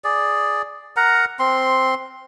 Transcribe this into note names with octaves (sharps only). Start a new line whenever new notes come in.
G#4 D5
A#4 F#5 A#5
C4 C6